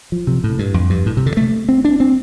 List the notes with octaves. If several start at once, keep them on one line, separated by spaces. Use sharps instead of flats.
F3
C3
A2
G2
F2
G2
A2
C3
D3
A3
C4
D4
C4